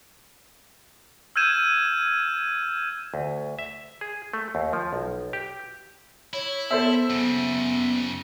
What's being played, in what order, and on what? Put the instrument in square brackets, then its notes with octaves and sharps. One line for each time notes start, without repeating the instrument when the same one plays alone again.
[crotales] E6 F6 G6 G#6 D#7 E7
[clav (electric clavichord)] D2
E5
G#4
A3
D#2
F3
B1
G4
[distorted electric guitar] E4 [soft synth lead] C#5
[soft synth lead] B3 [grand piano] A4 C5 E5
[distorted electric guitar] F#2 C#3 [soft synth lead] B3